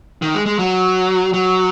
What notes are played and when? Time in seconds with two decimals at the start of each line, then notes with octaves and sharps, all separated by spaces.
0.22 D#3
0.34 G#3
0.46 G#3
0.59 F#3
1.34 F#3